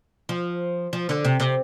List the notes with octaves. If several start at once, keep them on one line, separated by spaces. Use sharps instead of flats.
F3
F3
D3
C3
C3